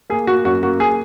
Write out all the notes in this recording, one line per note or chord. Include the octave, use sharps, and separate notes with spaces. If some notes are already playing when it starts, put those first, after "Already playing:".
A#3 G#4
A#3 F#4
F#2 F#4
A#3 F#4
G#4